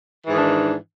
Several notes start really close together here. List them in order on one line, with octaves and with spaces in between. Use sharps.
E3 G#2 D#3 D4